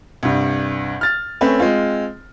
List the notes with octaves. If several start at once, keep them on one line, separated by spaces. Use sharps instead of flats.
C2 G2
F6 A6
A3 C4 C#4 B4
G#3 C4 F4